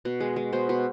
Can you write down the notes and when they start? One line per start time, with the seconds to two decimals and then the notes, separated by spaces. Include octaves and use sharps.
0.05 B2
0.20 G#3
0.36 G#3
0.53 B2 C5
0.69 B2